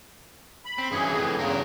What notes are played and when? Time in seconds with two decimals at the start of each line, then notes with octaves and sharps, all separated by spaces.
0.65 B5
0.78 C4
0.92 G2 E3 C#4 G#4
1.12 F2 A2
1.39 E2 G2 C#3 A#4 C#5